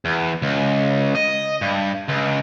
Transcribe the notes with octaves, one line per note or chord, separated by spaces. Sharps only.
E2
C#2
D#5
G2
C#2